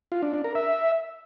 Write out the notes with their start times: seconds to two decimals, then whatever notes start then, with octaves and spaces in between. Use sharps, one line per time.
0.12 F4
0.23 D4
0.33 D4
0.44 A#4
0.55 E5